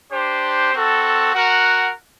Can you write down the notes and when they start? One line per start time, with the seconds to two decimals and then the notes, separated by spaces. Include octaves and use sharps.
0.11 D4 G4 C5
0.73 C4 F#4 A4
1.34 F#4 A#4 F#5